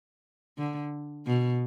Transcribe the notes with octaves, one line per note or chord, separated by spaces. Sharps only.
D3
B2